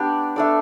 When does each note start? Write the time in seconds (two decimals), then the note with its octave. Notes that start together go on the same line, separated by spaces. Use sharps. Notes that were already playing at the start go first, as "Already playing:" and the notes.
Already playing: B3 D4 G4 D5
0.36 A3 D4 A4 D5